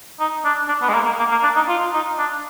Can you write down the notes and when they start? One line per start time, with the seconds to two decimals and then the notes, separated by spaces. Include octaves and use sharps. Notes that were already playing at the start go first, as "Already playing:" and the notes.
0.20 D#4
0.44 D4
0.68 D4
0.82 B3
0.89 G#3
0.94 A#3
1.06 A#3
1.19 A#3
1.31 A#3
1.43 D4
1.56 D#4
1.68 F4
1.93 D#4
2.18 D4